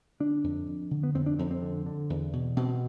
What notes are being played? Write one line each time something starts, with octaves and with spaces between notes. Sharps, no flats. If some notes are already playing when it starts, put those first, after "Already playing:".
D3 D4
F2
F2
D3
B3
F2 C4
D4
F2 C4
C4
D3
D3
E2
B2
B2 C4